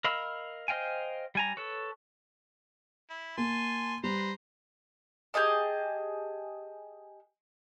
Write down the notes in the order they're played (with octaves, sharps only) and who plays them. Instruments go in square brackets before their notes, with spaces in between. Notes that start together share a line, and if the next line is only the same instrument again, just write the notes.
[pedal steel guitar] A#4 D#5 F5 B5 E6
C5 D#5 F5 G5 G#5
G3 G#5 A#5
A4 B4 C#5
[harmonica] E4
[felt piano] A#3 [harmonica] G#5 A5 C6
[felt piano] G3 [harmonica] B4 C5 A#5
[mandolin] G4 G#4 D#5 A5